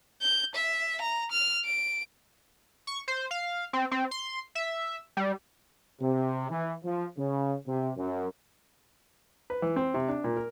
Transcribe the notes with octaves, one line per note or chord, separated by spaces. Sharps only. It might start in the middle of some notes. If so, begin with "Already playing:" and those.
G6
E5
A#5
F6
D7
C#6
C5
F5
C4
C4
C6
E5
G3
C3
E3
F3
C#3
C3
F#2
B4
E3
C4
C3
D4
A#2
A#4